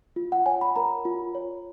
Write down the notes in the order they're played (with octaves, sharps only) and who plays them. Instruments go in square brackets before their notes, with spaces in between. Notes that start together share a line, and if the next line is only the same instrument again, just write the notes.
[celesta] F4
F#5
C#5 G#5
B5
A#4 A#5
F4
C#5